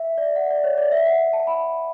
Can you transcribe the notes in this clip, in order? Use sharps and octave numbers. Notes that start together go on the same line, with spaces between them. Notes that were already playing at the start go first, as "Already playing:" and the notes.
Already playing: E5
D5
F#5
D5
C#5
D5
E5
F#5
A5
B5